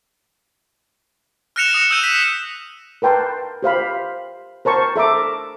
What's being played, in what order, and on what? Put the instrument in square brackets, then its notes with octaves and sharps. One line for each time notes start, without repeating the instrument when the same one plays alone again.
[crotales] F6 F#6 A#6 C#7 E7 F7
D#6
E6 F6 G6 D#7
B6
[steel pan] A#4 B4 G5 A5 C6
G4 C5 F5 B5
A#4 C5 A5 C#6
A4 E5 A#5 D6